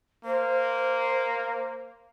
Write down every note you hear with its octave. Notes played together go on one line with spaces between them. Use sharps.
A#3 C5